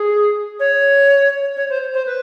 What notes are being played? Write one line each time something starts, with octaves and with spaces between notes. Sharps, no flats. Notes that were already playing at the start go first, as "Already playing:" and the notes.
Already playing: G#4
C#5
C#5
C5
C5
B4